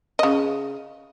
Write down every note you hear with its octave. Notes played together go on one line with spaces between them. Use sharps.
C#3 D#5